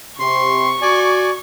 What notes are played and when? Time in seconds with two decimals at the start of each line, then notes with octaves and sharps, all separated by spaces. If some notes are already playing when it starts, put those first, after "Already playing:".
0.19 C3 C6 C#6
0.82 F#4 D5 G#5